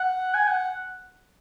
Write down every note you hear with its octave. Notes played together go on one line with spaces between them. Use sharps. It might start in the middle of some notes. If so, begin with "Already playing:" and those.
Already playing: F#5
G#5
F#5